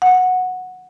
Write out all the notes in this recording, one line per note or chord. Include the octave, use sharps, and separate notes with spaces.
F#5